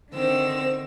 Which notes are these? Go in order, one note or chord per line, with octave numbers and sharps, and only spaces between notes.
D3 D#3 C4 E6